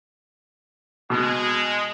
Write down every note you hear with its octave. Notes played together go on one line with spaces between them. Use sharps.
B2 G#3